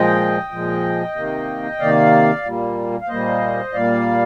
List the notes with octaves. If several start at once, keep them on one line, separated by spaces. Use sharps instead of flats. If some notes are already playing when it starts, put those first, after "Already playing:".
Already playing: A#2 F3 G#3 D#5 G5
A#2 F3 G#3
C3 D#3 A#3
C3 D#3 A#3 D5 F5
A#2 G3 A#3
F5
A#2 G3 A#3 C5 D#5
A#2 G3 A#3 D5 F5